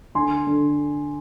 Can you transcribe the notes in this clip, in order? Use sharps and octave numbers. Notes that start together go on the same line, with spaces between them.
D3 G#5 C6
D3